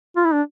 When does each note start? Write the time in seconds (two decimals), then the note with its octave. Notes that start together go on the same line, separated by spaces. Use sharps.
0.16 F4
0.25 E4
0.33 D4